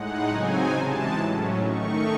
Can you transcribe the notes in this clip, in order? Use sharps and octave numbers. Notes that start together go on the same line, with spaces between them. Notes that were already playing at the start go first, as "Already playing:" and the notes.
Already playing: A2 G#3 D#4 F#5
C#3 F#3 C4 D#4 G#5
C3 E3 G#3 A5
A2 F#3 C#4
D#3 A3 D#4 C#6